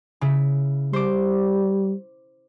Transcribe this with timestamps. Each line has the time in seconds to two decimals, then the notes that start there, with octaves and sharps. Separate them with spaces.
0.21 C#3 E4
0.93 G3 C5 D6